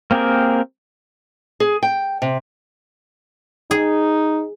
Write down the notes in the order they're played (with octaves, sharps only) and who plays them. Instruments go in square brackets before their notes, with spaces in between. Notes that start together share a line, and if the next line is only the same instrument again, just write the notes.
[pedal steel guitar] A#3 C4 G4 G#4 A#4
[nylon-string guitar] G#4
G5
C3
[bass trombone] D#4 [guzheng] G#4